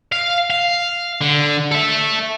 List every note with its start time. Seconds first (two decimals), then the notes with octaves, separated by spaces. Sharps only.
0.12 F5
0.50 F5
1.21 D3
1.71 A4 E5